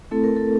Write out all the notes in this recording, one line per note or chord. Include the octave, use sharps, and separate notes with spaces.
A3 C4 E4 A4
A#4
A4